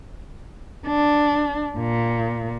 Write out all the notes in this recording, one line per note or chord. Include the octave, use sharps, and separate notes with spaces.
D4
A#2